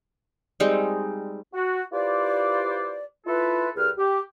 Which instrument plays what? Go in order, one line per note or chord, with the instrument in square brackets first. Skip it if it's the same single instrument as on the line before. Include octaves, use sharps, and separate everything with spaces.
[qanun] G3 G#3 C4 D#4
[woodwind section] F#4
E4 F4 G4 B4 C5 D5
E4 F4 A4 B4
C2 G3 G#4 B4 F6
G4